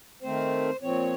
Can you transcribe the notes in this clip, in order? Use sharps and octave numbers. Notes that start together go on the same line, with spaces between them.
D#3 A3 C4 C5
A#2 F3 C4 C#5